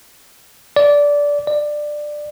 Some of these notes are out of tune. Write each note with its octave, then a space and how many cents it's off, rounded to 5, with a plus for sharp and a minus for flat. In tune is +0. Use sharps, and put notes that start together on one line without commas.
D5 -15
D5 +15